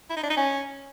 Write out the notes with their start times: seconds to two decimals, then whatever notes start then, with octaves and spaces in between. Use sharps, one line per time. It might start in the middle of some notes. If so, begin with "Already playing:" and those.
0.10 E4
0.17 D#4
0.23 D4
0.30 D#4
0.37 C#4